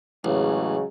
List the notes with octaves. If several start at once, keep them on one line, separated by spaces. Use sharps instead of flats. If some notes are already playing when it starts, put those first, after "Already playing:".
A1 C#3 F#3 G#3